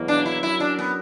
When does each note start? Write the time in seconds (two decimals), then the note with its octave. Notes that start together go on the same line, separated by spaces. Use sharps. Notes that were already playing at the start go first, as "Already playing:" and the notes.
Already playing: E2 B2 F#3 A#3
0.08 D4
0.26 E4
0.43 F#3 C#4 E4 F#4 A#4
0.60 D4
0.79 B3